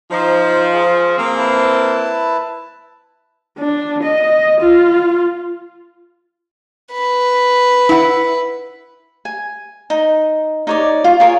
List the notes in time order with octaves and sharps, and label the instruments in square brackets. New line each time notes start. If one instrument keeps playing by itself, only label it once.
[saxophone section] F3 [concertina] D#4 C5
[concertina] F4 G#4
[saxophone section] A#3 C4
[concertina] E4 B4 A5
[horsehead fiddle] D4
D#5
F4
[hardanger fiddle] B4
[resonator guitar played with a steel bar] E4 F#5
[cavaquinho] G#5
D#4
D#4 C#5 D5
F4
F4 G#4 A#4 C#5